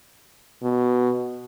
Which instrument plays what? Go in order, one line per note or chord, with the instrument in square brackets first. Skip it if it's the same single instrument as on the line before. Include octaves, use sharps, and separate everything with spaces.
[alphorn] B2